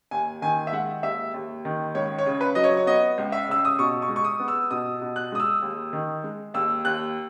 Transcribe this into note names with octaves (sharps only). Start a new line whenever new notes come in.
D#2 G#5
D#3 G#5
E5
G#3 F#5
D#2 E5
D#2
D#3
C#2 C#5
C#5
C#3
B4
F#3 D#5
C#5
C#5
B3 D#5
C#2
E5
C#3 E6
D#6
B2 C#6
C#6
G#3
C#6
D#6
B3
E6
B2 D#6
B2
F#6
G#3 D#6
E6
D#2
D#3
G#3
D#2 E6
D#2 F#6